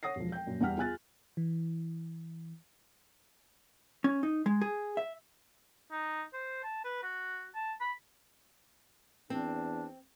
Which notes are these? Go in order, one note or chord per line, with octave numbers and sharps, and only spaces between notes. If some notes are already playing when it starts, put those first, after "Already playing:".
C#5 F#5 D#6 A#6 C7
E1 F3
G5 G6
F#2 A#2
E2 G3 F#5 F6 B6
F4 G#4 G#5 F#6 A6
E3
C#4
D#4
G#3
G#4
E5
D#4
C5
A5
B4
F#4
A5
B5
E2 C4 D4